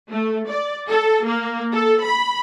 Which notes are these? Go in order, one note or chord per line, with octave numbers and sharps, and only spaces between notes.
A3
D5
A4
A#3
A4
B5